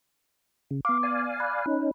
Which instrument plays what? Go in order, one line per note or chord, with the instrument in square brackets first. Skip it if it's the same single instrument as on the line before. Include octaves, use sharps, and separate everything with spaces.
[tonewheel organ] C#3
[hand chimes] B3 D6 [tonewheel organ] F5
[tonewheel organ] D5 F5 G#5
[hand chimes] B5 F#6
[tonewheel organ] C#4 D#4